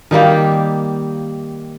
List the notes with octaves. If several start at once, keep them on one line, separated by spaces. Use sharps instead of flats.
D#3 G3 A#3 G4